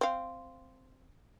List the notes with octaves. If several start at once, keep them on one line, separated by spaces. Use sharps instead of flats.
C4 F5